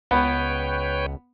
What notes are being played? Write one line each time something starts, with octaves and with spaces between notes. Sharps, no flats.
C#2 B3 B4 C#5 G5